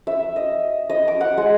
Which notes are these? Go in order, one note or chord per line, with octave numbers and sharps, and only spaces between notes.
E5
D#5
D#5
D6
F#5
G#3